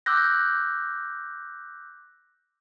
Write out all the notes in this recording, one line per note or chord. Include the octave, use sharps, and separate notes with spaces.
D6 E6 F#6 G6 A#6